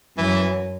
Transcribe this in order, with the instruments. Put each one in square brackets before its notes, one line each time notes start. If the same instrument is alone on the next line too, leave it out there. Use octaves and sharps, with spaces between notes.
[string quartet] F#2 [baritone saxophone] E3